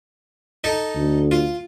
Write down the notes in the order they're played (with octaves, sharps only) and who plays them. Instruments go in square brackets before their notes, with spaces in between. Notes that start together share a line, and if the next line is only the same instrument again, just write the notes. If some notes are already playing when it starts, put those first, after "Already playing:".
[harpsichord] D#4 A4
[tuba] D2
[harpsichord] F4